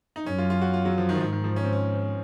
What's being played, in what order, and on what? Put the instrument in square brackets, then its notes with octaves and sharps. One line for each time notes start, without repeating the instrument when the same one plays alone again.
[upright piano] D#4
[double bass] F#2 [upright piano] C#4
[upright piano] F4
F4
F#4
F4
F#3
F3
D#3
F3
[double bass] G#2 [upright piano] D#3
[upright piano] D#3
F3
C#4
C4
C#4